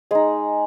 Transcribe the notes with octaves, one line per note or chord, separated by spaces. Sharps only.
G#3 D#4 G#4